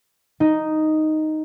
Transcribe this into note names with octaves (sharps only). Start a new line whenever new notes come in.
D#4